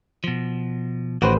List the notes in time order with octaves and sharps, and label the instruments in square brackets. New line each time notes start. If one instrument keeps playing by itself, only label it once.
[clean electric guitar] B2 F3
[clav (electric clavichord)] A1 B4 C5 [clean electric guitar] D#3 F#4